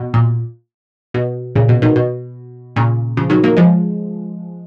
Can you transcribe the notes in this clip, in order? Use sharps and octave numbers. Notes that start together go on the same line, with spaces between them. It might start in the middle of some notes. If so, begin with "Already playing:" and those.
Already playing: B2
A#2
B2
A#2 C#3
B2
B2 D#3
B2
A#2 C#3
C#3 F3
D#3 F#3
F#3 A#3
F3 G#3